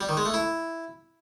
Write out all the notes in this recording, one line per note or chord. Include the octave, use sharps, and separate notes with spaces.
G3
D#3
G#3
A3
E4